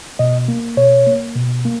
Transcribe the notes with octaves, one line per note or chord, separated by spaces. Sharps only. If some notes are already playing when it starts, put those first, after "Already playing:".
B2 D#5
A#3
B2 C#5
A#3
B2
A#3